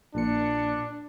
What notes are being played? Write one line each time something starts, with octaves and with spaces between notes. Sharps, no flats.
A#1 A#2 D4 C#7